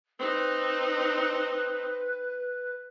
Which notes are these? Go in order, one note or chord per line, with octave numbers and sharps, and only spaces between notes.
C4 D#4 B4